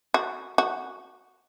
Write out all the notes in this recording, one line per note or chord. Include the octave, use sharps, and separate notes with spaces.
F#4
F#4